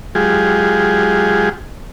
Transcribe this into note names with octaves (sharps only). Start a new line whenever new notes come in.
F#3 G#3 F4 G4 G#4